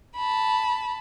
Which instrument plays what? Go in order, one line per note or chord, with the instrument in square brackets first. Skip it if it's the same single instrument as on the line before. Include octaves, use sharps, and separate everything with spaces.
[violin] A5 B5